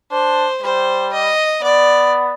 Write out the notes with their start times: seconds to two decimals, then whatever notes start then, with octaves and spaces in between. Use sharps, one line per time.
0.11 D4 C5
0.62 G3 C5
1.13 D#5
1.63 B3 D5